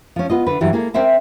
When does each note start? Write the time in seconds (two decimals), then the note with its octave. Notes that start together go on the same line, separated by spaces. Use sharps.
0.16 F3 C#4
0.30 B3 F4 D#5
0.47 D3 B4
0.61 G2 E3 F#3 G3
0.73 A#3 G#4 A4
0.94 C4 A#4 C5 E5 G#5